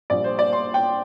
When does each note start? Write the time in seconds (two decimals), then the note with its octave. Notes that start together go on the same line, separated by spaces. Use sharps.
0.10 A#1 A#2 G3 D5
0.24 C5
0.39 D5
0.53 C6
0.74 G5